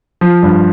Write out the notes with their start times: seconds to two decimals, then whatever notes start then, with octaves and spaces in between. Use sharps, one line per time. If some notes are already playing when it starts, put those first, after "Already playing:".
0.21 F3
0.43 G2